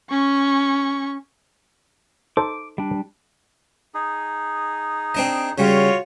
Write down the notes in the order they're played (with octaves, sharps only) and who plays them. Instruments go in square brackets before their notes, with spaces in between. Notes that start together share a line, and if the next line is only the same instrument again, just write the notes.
[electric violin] C#4 C#6
[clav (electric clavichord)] D#4 A4 C5 [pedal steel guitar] D6
[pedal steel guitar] G3 D4
[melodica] D#4 G#4
[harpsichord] C4 D4 D#5
[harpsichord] C#3 G3 [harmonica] F4 F#4 C#5